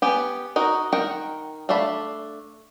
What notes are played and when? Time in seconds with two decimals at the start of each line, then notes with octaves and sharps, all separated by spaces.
0.02 B3 G4 G#5
0.56 D#4 F#4 A#4
0.92 D#3 A#4 F#5 G5
1.69 A3 D4 F5 A5 B5